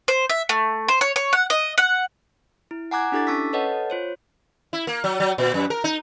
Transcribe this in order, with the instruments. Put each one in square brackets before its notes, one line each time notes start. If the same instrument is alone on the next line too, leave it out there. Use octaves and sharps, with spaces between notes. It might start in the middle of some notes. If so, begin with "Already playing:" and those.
[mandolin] C5
E5
A3
C5
C#5
C#5
F#5
D#5
F#5
[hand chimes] E4
F#5 G#5 A#5 D6 F#6 G#6
D4 E4 G4 A4 D6 A6
C#4 A5 C#6 E6 B6
A4 B4 C#5 D#5 F#5 A5
F4 C5 C#5
[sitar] E4
A#3
F#3
F#3
A#2
F#2
A#4
D#4